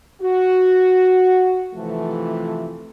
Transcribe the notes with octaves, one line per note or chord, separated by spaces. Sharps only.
F#4
C3 E3 F3 A3